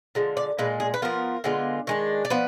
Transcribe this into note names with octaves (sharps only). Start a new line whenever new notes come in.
D3 F3 G#3
D5
A#2 G#3 D4 B4
G#4
B4
F3 B3 F4 A#4
D3 G#3 B3 F4
D#3 G#3 D4
D5
F3 B3 B4